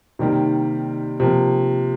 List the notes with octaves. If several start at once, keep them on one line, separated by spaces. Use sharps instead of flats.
C3 D#3 G3 A#3
C3 F3 A#3